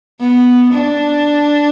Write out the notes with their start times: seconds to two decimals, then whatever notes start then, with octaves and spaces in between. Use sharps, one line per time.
0.20 B3
0.73 D4